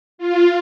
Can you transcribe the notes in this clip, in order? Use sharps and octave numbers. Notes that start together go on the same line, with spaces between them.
F4